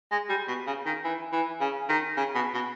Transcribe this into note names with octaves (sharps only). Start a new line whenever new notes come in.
G#3
G3
B2
C#3
D#3
E3
E3
C#3
D#3
C#3
B2
B2